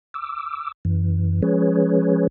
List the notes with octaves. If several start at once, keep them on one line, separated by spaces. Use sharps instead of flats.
D6 E6
F#2 E3
F3 G#3 C#4 G#4 B4 C#5